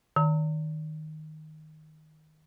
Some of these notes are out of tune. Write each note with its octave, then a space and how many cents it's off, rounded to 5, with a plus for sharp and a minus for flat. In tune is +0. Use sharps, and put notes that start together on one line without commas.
D#3 +0 A#5 -35